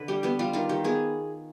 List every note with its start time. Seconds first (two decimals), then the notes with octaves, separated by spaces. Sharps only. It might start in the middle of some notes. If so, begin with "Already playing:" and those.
Already playing: D3 B4
0.08 G3 G4
0.23 B3 G4
0.39 G3 F4
0.53 D#3 F4
0.69 D#3 G4
0.84 B3 G#4